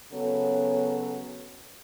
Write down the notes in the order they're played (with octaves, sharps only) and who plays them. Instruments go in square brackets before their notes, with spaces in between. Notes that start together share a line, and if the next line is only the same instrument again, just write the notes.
[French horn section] C#3 F#3 B3 A4